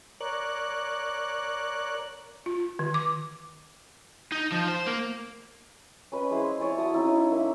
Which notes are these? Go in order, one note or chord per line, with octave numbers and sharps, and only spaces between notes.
A#4 C#5 D5 F#6
F4
D#3
D6
D#4
F3
C5
A#3
C#4 B4 D#5
G#3 E4 C5
E4 C#5 D5 G#5
F#3 E4 A5 D#6
C#4 D#4 E4
A#3 E5